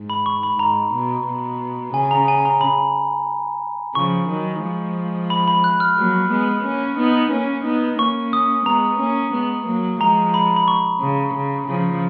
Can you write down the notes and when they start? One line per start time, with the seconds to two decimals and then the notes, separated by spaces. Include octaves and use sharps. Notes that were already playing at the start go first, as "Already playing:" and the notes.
Already playing: G#2
0.10 B5
0.26 C#6
0.43 B5
0.59 G#2 A#5
0.94 B2
1.27 B2
1.94 C#3 G#5
2.11 A#5
2.28 G#5
2.45 A#5
2.61 B5
3.95 C#3 F3 C#6
4.29 D#3 F#3
4.63 F3 G#3
5.30 B5
5.48 B5
5.64 F#6
5.80 F6
5.97 F#3 A#3
6.31 G#3 B3
6.64 A#3 C#4
6.98 B3 D#4
7.32 A#3 C#4
7.65 B3 D#4
7.98 A#3 C#4 C#6
8.33 D#6
8.66 G#3 B3 A#5
8.99 A#3 C#4
9.33 G#3 B3
9.67 F#3 A#3
10.00 F3 G#3 A#5
10.34 B5
10.56 B5
10.68 C#6
11.01 C#3
11.34 C#3
11.68 C#3 F3